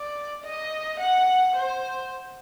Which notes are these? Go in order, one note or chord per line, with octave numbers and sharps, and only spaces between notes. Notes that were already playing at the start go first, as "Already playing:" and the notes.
Already playing: D5
D#5
F#5
C5